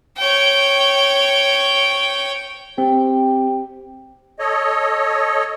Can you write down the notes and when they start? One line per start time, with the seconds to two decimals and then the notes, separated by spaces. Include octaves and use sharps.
0.18 C#5 G5
2.78 C4 G4
4.39 A4 C#5 D#5